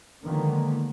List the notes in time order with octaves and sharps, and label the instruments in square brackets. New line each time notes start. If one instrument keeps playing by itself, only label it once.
[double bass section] D3 D#3 F3 G#3 A#3 B3